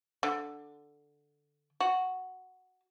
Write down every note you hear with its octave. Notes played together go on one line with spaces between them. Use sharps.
D3
F#4